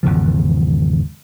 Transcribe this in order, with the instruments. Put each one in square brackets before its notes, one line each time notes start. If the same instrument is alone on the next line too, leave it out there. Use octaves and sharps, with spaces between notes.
[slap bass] G#1 E2 C#3 F3